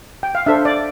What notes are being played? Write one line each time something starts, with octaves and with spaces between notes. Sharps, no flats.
G5
F5
D4 A4 C5 E5
D5